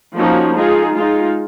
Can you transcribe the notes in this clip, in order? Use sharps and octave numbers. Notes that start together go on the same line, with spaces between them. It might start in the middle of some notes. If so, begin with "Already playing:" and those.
F3 A#3 C#4 D#4 F#4
G#3 D#4 F4 G#4
G#3 D#4 F4